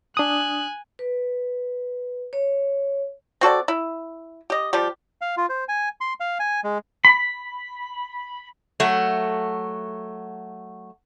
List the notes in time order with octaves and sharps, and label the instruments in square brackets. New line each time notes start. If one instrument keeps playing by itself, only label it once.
[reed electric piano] D4 D#6 [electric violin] G#5 F#6
[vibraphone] B4
C#5
[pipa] C4 F#4 A4 D5
E4
G4 D#5
F3 G3 G4
[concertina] F5
F4
C5
G#5
C6
F5
G#5
G#3
[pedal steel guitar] B5
[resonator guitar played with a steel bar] F#3 A3 F#4